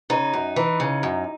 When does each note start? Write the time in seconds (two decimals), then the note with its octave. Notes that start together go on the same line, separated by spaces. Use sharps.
0.10 C#3 D#4
0.34 F#2
0.56 E3
0.80 C#3
1.03 F#2